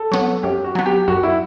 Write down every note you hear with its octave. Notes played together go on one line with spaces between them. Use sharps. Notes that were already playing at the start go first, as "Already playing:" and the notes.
Already playing: A4
F#3 B3
F#2 G4
F#4
F#3 B3
G4
F#2 F#4
E4